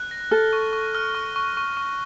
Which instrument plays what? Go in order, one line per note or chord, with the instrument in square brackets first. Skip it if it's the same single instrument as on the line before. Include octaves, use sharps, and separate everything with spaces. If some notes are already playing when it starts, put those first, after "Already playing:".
Already playing: [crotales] F#6
A#6
[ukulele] A4 [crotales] F6
[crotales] C#6
C#6
F6
C#6
C#6
C#6
C#6